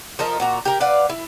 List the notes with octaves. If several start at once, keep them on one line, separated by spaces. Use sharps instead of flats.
F3 A4 A#4 D#5
A#2 F#4 A#5
G4 A#4
B4 D5 F5 F#5
E4